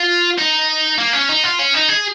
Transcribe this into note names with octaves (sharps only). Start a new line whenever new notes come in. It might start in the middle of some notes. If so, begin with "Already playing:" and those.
Already playing: F4
D#4
A#3
C#4
D#4
F4
C#4
D#4
G#4